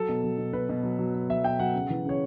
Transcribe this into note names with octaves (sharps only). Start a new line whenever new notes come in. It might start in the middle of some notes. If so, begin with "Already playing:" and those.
Already playing: F#3 A4
B2
F#3
B2
B2 B4
B2
F#3
F#3
B2
F#3 E5
B2 G5
F#3 F#5
C#3
E3
C#3 C#5